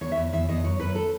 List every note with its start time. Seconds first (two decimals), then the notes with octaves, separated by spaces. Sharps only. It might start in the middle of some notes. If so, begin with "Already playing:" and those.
0.01 E2 C#5
0.12 E5
0.16 E2
0.33 E2 E5
0.49 E2 D#5
0.64 F#2 C#5
0.80 F#2 B4
0.95 A4